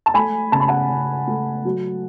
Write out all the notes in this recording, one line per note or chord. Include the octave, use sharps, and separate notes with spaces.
A5
A3 G#5 B5
C#3 A5
B5
F#5 A5
C#3
A3
F#3